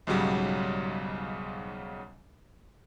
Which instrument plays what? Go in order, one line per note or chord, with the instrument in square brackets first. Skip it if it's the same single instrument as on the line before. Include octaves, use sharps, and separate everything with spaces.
[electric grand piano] B1 G#2 C#3 F#3 G3